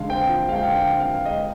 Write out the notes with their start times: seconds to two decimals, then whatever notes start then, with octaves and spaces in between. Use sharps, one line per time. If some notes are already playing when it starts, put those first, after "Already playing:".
Already playing: D3 G#3 F5
0.09 C4 G5
0.29 F3
0.49 G#3 F5
0.56 G5
0.63 F5
0.68 D3
0.73 G5
0.87 C4
1.00 F5
1.06 F3
1.25 G#3 D#5